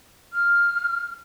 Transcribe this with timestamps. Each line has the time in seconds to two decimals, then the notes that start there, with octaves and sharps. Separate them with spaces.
0.33 F6